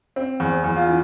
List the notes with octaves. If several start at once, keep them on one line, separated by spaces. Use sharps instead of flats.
C4
E2
E2
F4
E3